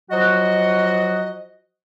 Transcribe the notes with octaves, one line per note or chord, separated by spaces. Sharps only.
F3 F#3 F#4 D#5